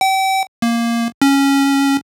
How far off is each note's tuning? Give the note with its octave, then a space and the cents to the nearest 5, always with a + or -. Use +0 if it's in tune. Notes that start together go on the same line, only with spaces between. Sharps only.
G5 -35
A#3 +0
C#4 -5